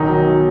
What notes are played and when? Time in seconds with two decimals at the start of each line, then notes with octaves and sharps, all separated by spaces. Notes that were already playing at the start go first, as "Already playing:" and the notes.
Already playing: B1 D#3 D#4
0.09 F#3
0.26 B2